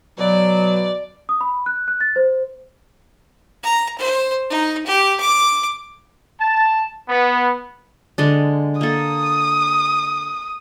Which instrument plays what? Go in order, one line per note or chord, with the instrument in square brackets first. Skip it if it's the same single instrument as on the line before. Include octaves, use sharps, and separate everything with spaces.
[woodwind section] B2 F#3 [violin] D5
[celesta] D#6
B5
F#6
F#6
A6
C5
[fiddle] A#5
C5
D#4
G4
D6
[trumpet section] A5
B3
[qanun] D3 G#3 D4
[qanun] A#3 A4 [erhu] D#6